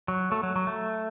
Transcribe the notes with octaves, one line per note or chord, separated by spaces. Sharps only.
F#3
A3
F#3
F#3
A3